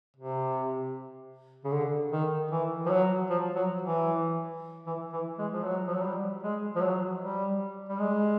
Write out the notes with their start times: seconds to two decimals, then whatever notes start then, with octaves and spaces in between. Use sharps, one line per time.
0.16 C3
1.65 C#3
1.73 D3
2.12 D#3
2.51 E3
2.86 F3
2.90 F#3
3.30 F3
3.55 F#3
3.82 E3
4.87 E3
5.13 E3
5.39 G#3
5.53 F3
5.64 F#3
5.88 F3
5.95 F#3
6.03 G3
6.43 G#3
6.75 F3
6.82 F#3
7.21 G3
7.89 G3
8.00 G#3